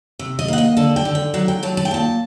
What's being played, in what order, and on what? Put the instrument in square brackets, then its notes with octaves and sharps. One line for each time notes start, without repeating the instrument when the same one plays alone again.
[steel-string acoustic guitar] C3
D#5
A#3 F#5
D#5
D3 A5
G5
D3
G5
F#3 F#5
G5
F#3 A5
A5
G5
A#2 A5